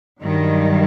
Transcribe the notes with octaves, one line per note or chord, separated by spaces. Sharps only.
G2 D#3 F#3